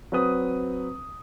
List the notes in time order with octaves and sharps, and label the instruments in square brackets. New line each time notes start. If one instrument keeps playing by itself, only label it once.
[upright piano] F#3 C4 B4 D#6